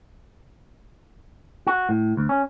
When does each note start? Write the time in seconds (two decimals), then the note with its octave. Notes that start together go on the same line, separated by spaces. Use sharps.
1.67 F#4
1.89 A2
2.17 D2
2.29 C#4